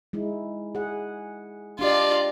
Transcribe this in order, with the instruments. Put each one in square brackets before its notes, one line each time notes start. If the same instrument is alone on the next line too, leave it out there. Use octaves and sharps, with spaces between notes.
[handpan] G#3 D#4 E4
G#4 F#5
[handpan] D4 G4 D#5 [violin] F4 D5